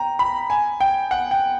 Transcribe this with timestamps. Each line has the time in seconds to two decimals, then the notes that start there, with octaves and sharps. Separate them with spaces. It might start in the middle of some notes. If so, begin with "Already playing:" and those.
Already playing: G5 A#5
0.19 B5
0.50 G#5
0.80 G5
1.11 F#5
1.31 G5